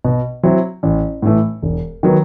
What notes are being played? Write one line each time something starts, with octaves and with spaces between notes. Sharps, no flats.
B2
F#3 C4 E4
A1
A2 E3 A3
E1
D#3 F#3 B3